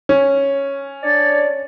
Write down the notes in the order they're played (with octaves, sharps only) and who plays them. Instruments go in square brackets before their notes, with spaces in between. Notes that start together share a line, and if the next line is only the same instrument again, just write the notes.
[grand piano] C#4
[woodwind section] D4 C#5 D5